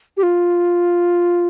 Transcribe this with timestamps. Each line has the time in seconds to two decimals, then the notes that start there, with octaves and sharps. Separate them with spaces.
0.17 G4
0.23 F4